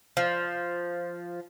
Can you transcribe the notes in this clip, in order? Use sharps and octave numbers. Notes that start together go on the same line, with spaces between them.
F3